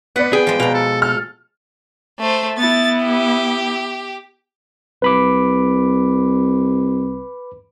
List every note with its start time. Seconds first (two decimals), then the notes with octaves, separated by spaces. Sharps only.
0.16 B3 B4 D5 F#5
0.33 G#4 G5
0.47 F3 G#3
0.60 B2 F5 A#5
0.74 A4
1.02 A4 F6
2.20 A3 C5
2.58 B3 E4 A6
3.04 G4
5.02 C2 B4 B5 D6